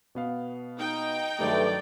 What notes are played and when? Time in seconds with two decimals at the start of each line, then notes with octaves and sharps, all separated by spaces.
0.15 B2 B3 F5
0.79 D#4 G5
1.40 G2 D#3 F#3 A3 G4 B4 D5